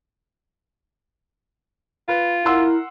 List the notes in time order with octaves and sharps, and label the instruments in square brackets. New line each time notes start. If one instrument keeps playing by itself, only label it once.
[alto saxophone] F4 [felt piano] B4
[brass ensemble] E4 A#4 [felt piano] F#5 C6 E6